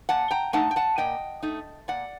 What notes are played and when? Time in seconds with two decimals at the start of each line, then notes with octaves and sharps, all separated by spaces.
0.09 A#2 F#5 A5
0.31 G5 A#5
0.53 A3 D#4 F#5 A5
0.71 G5
0.76 F#5 A5
0.98 A#2 D#5 G5
1.43 A3 D#4
1.88 A#2 D5 F#5